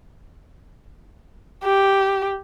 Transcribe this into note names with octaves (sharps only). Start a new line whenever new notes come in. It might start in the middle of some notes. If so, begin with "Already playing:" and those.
G4